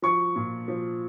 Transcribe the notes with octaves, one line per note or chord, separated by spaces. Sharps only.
F3 C#6
A#2
F3